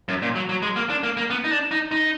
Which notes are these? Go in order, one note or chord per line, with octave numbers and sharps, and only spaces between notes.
F#2
A#2
F#3
F#3
G#3
A#3
D4
A#3
A#3
B3
D#4
D4
D#4
D#4